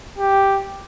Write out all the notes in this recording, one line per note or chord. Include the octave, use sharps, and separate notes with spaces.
G4